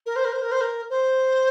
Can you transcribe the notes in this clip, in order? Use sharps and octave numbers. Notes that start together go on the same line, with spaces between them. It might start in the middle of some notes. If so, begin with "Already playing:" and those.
A#4
C5
A#4
C5
A#4
C5
A#4
C5